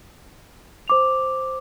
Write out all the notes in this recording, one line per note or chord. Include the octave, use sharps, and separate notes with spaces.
C5 D6 F7